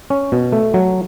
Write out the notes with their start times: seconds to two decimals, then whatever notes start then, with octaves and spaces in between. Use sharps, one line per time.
0.10 C#4
0.32 B2
0.53 A3
0.74 F#3